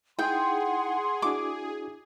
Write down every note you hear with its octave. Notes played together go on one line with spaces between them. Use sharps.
D#4 E4 G#4 F#5 G5 C6
D4 E4 F#4 D6